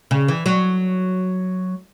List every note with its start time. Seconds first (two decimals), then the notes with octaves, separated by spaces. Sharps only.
0.11 C#3
0.28 E3
0.46 F#3